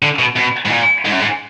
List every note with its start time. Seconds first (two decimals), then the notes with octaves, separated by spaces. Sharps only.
0.02 D3
0.19 B2
0.36 B2
0.66 G#2
0.70 A#2
1.05 G#2
1.12 F#2
1.20 G#2